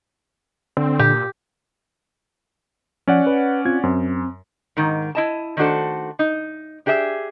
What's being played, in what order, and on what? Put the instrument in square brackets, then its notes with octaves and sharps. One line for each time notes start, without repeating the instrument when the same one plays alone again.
[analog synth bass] D3 [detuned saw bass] C4
[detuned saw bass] A#2 [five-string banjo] G4
[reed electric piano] F3 [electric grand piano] C#4 D5 F#5
[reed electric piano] B4
C4 F4 G#6
[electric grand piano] F#2 [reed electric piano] C4
[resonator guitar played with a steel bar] G#2 D#3
E4 D#5 A5
D#3 A3 D4 F#4 A4 C5
D#4
D4 G4 G#4 D#5 E5